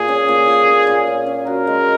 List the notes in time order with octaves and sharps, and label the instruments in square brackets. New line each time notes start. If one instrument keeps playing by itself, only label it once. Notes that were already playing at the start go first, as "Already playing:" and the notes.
Already playing: [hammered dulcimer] A#2 [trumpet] G#4
[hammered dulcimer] C#4
A#2
A#2
C#4
A#2
C#4
C#4
[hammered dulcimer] F#4 [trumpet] A#4
[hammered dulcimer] G#3